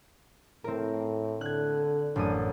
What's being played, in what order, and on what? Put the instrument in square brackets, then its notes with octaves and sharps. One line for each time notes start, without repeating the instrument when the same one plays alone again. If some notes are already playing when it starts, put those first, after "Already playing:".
[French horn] A2 [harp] C4 A#4
[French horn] D3 [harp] F#6 G#6
[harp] A1 F#2 D#6 [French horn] D4